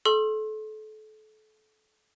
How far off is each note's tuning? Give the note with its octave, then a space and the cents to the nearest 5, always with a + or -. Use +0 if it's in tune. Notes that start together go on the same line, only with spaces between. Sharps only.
A4 -30 C6 +35 E6 +40